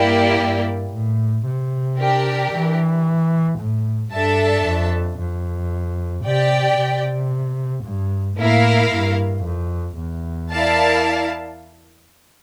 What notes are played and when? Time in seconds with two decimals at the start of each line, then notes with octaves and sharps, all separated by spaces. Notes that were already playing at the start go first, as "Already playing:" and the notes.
Already playing: G2 A#3 E4 G4 D5
0.40 G2
0.93 A2
1.47 C3
1.99 D4 G4 A#4
2.52 E3
3.59 A2
4.12 G2 D4 A4 E5 A5
4.65 F2
5.19 F2
6.25 C3 G4 D5 G5
6.78 C3
7.84 G2
8.38 A2 A#3 E4 A#4 F5
8.91 G2
9.45 F2
9.98 E2
10.51 E4 A#4 D5 F5 A5